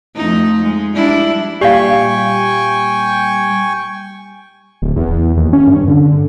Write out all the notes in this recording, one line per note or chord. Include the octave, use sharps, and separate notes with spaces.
F2 A3 D#4
G#3
G3 D4 E4
A#2 G3 G4 F5 G5 G#5 C#6
D1
E2
D#2
C#4
G2
D3